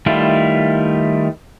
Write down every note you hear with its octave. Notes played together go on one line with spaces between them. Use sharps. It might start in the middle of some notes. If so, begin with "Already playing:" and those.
D#3 G3 A3 E4 F4